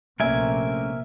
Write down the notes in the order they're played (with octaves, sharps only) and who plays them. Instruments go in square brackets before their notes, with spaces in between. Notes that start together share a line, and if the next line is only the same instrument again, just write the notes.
[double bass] A#1 C3 [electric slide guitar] A3 A#3 C#4 [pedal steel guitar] A#4 G#5 [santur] E5